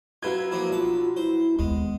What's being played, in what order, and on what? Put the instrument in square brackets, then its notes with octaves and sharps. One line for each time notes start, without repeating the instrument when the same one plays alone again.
[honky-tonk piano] F#3 B4 G#6 [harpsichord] E4 F4
[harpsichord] F3 A#3 E4
[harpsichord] B1 A5 [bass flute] F4
[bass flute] E4 [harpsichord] C5
[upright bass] D#2 [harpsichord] G#3 [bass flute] B3